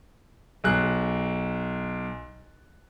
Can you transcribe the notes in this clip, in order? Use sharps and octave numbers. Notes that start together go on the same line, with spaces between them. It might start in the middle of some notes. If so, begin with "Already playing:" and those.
B1 G#4 F#6